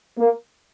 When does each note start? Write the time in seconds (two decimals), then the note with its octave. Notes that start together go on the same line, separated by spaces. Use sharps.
0.18 A#3